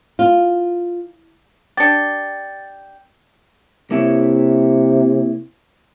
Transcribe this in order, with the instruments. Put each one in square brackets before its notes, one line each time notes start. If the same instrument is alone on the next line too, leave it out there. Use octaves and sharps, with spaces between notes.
[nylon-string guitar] F4
[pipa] D4 G4 [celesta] A6 C#7
[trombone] C3 [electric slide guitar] A#3 E4 C#5